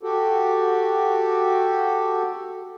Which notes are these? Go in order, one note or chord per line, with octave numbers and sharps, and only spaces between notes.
F#4 G4 A4